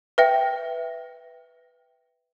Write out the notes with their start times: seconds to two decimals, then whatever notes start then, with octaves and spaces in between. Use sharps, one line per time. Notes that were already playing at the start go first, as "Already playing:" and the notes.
0.18 B4 E5 G5